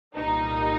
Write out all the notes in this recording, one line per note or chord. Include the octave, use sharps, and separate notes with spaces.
C2 A#2 G3 A#3 D#4